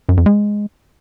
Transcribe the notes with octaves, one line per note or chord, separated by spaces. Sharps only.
F#2
F2
G#3